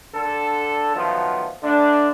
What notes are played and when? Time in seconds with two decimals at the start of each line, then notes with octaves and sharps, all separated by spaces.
0.15 D3 A4
0.95 D#3 F3 F#3 A3 B3
1.63 D3 A3 D4